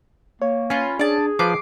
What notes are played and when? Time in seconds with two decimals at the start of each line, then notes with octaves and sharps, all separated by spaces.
0.42 A#3 C#5
0.70 C#4 F4 B4
0.99 D4 G#4 D5 A5
1.39 F3 B4 D6 C7